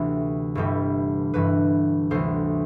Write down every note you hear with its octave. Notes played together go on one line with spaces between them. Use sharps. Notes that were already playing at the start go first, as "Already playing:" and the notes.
Already playing: D2 C3 E3
G1 G2 E3 G4
G1 G2 E3 B4
D2 C3 E3 C5